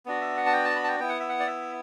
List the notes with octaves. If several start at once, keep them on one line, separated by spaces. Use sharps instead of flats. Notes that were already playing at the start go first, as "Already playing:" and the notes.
B3 D4 F#4
E5
F#5
A5
G5
A5
B5
A5
G5
B3 E4 G5
F#5
E5
F#5
D5
E5